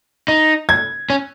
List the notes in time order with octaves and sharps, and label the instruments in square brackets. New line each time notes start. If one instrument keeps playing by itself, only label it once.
[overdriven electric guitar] D#4
[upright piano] G#6
[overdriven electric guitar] C#4